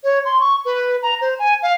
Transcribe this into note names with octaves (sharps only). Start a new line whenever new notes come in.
C#5
C6
C#6
B4
A#5
C5
G#5
F5